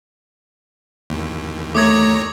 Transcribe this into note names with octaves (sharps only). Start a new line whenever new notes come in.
D#2
D#2 A3 C#5 A#5 D6 D#6 G#6